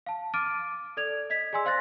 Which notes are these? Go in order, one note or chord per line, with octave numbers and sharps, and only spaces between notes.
F5 A5
D6 F6 A6 D7 D#7
A4 D5 G#6 F7
D#5 G#6 B6
G#4 D5 G#5 C6 E6
C5 F5 C6 F#6 A6 A#6